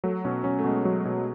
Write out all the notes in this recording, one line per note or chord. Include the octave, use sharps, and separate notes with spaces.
F#3 A3
B2 C#4
F#3 C#4
A3
B2 G#3
F#3
B2